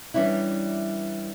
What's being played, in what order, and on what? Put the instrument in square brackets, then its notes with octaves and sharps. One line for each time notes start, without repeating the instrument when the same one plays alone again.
[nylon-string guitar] E3 G3 C#4 D4 E4